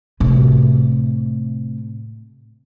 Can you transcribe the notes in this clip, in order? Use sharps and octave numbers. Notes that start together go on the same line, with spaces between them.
A2 C3